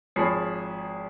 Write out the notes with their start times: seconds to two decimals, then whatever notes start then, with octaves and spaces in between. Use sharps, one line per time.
0.16 G#1 F3 G#4 C#5 B5 C7